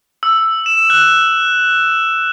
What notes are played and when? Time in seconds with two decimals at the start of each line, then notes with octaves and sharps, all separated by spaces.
0.23 E6
0.66 E7
0.90 F#6